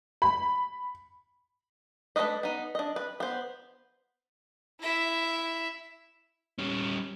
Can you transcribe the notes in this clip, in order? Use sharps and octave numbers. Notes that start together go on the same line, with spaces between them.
B5
A3 A#3 D4 B4 D#5
B3 D#4
D4 D#5
B4
B3 C5
E4 E5
G3 C#4